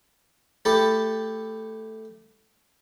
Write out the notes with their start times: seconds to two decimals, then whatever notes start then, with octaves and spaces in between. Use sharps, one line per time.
0.65 A3 E4 G4 A4